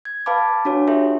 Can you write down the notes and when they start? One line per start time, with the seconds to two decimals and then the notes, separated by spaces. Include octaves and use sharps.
0.05 G#6
0.26 B4 F5 A5 B5 D6
0.65 D4 F#4 C#5
0.88 F4 G4 A4 C#5 E5